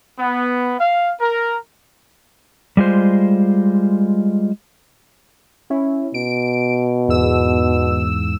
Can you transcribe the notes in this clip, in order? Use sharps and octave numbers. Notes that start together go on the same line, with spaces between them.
B3
F5
A#4
G3 G#3 F4 C5
C#4 E4
B2 D7
E2 G#2 E6